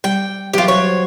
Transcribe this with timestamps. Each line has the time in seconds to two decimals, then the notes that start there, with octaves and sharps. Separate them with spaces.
0.04 G3 G5
0.53 E3 F#3 F4 G4
0.68 F#4 C5 C#5